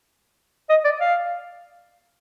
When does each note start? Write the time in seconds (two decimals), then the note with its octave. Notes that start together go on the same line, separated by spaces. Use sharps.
0.69 D#5
0.84 D5
1.01 F5